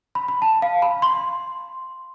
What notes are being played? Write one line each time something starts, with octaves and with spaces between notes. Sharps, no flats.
B5
B5
A5
F5
B5
C6